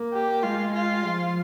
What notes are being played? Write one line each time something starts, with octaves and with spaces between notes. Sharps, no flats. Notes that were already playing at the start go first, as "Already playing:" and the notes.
Already playing: A#3
G4
G#3 F4
F4
F3